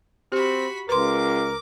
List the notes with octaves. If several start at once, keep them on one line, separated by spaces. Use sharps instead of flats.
C4 F#4 G4 B5
C#2 A#4 B4 C6 D6